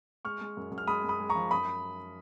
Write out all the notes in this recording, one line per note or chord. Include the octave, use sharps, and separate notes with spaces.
G#3 C#6 F6
G#3
F#2
F#2
F6
G#3 B5 D#6
F#2 B5 D#6
G#3
A#5 C#6
F3
F#2 B5 D#6